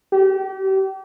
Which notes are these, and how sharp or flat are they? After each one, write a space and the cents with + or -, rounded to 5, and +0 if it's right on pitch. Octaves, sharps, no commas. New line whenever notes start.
G4 -35